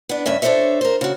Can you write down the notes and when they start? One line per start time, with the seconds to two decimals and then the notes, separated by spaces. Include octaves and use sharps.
0.09 B3 D4
0.26 G2 C#3 C#4 E5
0.42 D4 A4 A#4 C5 C#5 E5
0.81 A#4 C5
1.01 C#3 F#4